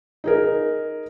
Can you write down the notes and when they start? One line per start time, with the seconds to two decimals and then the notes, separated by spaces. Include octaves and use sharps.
0.24 D#4 G#4 A#4